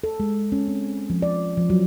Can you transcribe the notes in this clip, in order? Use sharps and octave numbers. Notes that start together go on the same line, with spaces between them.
A4
G#3
C#4
C4
F3
D5
F3
F#3